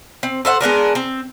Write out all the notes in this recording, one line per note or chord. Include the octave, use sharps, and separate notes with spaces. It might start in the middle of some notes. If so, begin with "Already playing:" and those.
C4
A4 C5 E5 F#5
G#3 B3 D4 A#4
C4